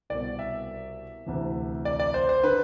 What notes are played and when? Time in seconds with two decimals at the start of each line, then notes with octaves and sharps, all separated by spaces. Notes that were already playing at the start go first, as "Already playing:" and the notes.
0.10 C2 B2 D5
0.39 E5
1.26 D2 C3 E3
1.85 D5
2.00 D5
2.14 C5
2.29 C5
2.44 D3 B4